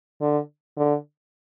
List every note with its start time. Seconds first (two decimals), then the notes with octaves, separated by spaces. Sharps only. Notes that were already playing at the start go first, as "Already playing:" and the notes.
0.21 D3
0.77 D3